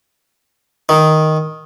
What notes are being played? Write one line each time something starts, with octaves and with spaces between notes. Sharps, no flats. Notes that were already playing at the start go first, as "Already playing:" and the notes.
D#3